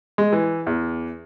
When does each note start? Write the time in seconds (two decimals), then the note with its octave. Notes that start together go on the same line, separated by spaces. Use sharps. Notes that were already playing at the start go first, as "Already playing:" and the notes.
0.18 G#3
0.33 E3
0.67 E2